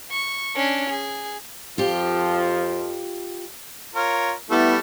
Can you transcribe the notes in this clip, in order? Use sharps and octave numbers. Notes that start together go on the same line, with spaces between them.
C#6
C#4 D4
G#4
F2 F3 F4 G4
F4 A#4 C#5
G3 A3 B3 E4 A4